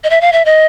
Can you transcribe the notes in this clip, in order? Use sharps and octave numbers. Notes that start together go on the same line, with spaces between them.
D#5
E5
F5
E5
D#5